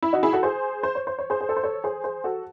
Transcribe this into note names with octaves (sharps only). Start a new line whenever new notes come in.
E4
D#4 F#4
E4 G#4
F#4 A4
G#4 C5
C5
C#5
C5
C#5
G#4 C5
G#4
A4
C5
A4 C#5
G#4 C5
G#4 C5
F#4 A4